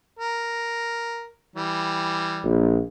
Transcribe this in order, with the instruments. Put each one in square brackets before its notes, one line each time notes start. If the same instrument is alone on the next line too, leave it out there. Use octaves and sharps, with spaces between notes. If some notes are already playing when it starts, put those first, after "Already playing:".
[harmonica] A#4
E3 G3
[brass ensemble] A#1